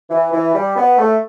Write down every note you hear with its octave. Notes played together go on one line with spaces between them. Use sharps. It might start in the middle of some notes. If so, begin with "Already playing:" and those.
E3
E3
G3
B3
A3